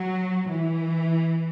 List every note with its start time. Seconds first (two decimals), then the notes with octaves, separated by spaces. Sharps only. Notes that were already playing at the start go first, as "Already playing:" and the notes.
Already playing: F#3
0.49 E3